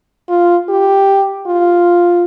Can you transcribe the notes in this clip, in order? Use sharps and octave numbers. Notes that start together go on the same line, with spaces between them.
F4
G4
F4